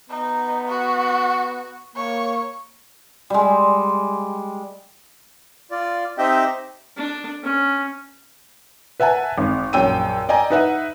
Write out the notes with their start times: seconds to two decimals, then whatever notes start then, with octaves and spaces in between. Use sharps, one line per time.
0.10 B3 D#4
0.69 F#4
1.96 A#3 C#5
3.30 G3 G#3
5.71 F4 D5
6.18 C4 D#4 G4 D#5 E5 G5
6.97 D4
7.43 C#4
9.00 B4 E5 F#5 G#5 A5
9.38 G#1
9.73 A#1 F#2 C#5 G5 E6 D#7
10.29 D5 D#5 G5 G#5 A#5
10.50 D#4 B4 E5 F#5